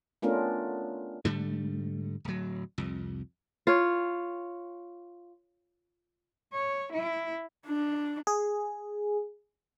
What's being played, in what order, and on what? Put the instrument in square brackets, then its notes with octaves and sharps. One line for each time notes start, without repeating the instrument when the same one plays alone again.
[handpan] A3 B3 C#4 D4 F4 A#4
[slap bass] G#2 D3 G3 A3
D1 F#3
C2 F2
[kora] F4 C#5
[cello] C#5
E4
[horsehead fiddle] D4
[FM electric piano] G#4